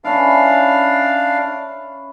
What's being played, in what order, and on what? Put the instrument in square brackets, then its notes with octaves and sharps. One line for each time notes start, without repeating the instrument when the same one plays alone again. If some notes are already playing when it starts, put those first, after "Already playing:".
[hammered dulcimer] C#4 E4 [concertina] D4 F5